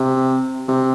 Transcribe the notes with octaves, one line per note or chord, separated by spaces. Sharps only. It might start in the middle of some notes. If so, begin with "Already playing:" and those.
Already playing: C3
C3